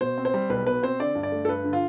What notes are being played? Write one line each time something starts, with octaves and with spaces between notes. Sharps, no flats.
B2 C5
C4
C5
G3
B1 B4
B2 B4
C4 C5
D3 D5
G2
D5
A3
A4
G2 B4
D3
F4